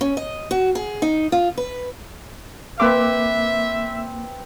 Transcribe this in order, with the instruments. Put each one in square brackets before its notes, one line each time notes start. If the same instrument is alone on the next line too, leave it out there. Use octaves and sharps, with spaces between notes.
[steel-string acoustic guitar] C#4
D#5
F#4
G#4
D#4
F4
B4
[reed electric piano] A#3 D6 [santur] C4 B4 [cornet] E5